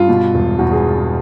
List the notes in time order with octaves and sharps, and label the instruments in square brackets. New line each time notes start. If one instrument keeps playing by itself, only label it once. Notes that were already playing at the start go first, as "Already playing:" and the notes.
Already playing: [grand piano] G2 [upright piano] F4
[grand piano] B2
E1
[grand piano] E2 [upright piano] F#4
[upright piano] G#4